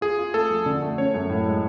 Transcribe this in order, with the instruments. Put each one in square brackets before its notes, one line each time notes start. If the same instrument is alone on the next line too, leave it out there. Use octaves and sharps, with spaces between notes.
[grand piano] F4 [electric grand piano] G#4
[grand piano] F4
[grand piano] A3 [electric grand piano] A4
[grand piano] F3
D3
A3
[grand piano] C#4 [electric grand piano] C#5
[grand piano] F#2
A2
G#3